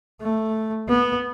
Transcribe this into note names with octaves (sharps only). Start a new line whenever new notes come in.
A3
B3